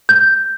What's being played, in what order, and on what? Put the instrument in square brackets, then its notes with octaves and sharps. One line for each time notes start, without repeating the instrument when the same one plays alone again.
[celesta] G6